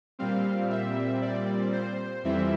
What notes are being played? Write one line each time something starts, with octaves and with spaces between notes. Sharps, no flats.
A#2 G3 C4 F5
E5
D5
C5
F2 E3 G3 C4 E5